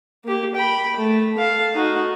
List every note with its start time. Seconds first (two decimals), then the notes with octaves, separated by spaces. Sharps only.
0.25 A#3 G4
0.55 G5 B5
0.97 A3
1.38 A4 F5
1.75 D#4 F#4